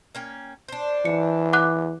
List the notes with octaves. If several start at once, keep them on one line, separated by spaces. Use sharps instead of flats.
A#3 C#4 G5
D4 C5
E3 C#7
F#5 D6 F#6